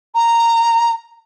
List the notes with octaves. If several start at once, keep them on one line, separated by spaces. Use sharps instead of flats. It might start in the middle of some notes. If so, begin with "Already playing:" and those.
A#5